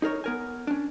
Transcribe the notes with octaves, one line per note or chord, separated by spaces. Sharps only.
D#4 G#4 A#4 C#5
B3 A#4 G#5
C#4 D4